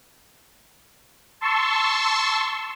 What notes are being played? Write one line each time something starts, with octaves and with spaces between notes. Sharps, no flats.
A5 C6 C#6 E6